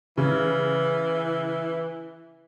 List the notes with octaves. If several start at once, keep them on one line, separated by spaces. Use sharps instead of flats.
C#3 E3